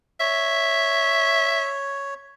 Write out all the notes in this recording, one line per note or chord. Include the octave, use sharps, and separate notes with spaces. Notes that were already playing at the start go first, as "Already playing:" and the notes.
C#5 E5